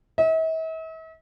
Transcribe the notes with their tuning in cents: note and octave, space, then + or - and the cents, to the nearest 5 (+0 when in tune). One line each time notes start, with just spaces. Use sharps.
E5 -45